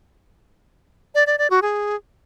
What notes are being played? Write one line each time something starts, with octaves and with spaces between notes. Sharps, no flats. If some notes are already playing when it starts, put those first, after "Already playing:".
D5
D5
D5
F#4
G#4